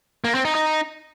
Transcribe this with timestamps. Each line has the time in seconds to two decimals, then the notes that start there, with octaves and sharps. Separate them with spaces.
0.24 A#3
0.35 C4
0.45 D#4
0.55 D#4